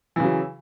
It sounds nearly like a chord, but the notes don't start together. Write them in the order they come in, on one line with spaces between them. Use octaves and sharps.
E3 C#3 F#3